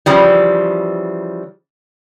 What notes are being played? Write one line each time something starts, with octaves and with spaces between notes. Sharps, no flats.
C#3 E3 F3 G3